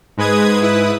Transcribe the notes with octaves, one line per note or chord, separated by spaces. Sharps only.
G#2 G#3 B4 D#6 G#6
G#2 E4 B4 D#6